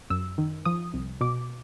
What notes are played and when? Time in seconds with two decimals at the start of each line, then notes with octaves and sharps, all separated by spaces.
0.10 F#2 E6
0.38 D#3
0.65 F3 D#6
0.94 C2
1.21 B2 D6